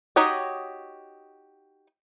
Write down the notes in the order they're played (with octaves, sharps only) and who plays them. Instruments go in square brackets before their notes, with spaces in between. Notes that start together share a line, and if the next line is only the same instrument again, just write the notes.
[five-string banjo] D#4 F#4 G4 C#5 D#5